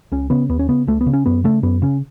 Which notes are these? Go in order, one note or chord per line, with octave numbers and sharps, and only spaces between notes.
C#2 C#4
C#3 B3
D#2 B3
C#4
C#3 B3
C#2 A3
B3
C#3
C#4
F#2 B3
C#3 A3
F#2 B3
C#3 C#4